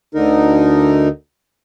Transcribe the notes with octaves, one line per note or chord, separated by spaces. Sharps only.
D2 D3 D#4 A#4